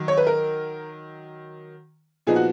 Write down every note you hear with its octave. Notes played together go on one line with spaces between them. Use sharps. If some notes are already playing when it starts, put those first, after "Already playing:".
Already playing: D#3 F#3
C#5
B4
A#4
A#2 F3 B3 D#4 G#4
F#4